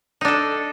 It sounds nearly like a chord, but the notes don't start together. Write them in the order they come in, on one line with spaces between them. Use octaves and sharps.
D#4 D4 A4